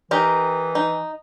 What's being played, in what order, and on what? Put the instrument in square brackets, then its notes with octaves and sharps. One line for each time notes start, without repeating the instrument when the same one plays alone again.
[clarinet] E3 [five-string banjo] D#4 G4 A#4
[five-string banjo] D#4